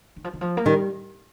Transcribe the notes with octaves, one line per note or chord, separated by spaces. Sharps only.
D#3
F3
D#3
F3
A#3
D#3 G3